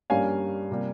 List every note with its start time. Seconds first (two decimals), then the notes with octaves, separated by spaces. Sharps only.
0.10 G2 G3 A#3 C#4 F5 G#5
0.71 C3 G3 A#3